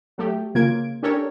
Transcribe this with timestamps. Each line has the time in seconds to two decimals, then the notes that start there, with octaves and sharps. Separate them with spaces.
0.18 F#3 A3 G4
0.55 C#3 A#3 F4 G#6 D7
1.02 C#4 D4 G4 A4 A#4 C#5